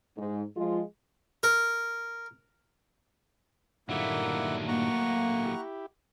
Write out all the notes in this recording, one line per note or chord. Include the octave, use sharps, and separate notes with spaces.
G#2
F3 G#3 F4
A#4
G2 A#2 D#3 F#3 A3 A#3 E4 F#5
A#3 F#5 A#5 C#6
E4 G4